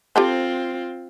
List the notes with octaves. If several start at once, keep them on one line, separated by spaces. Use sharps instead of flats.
C4 F4 G4 A4 C5